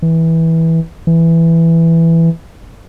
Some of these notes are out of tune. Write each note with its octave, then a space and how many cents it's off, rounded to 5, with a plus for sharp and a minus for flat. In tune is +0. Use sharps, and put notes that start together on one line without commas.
E3 -15
E3 +5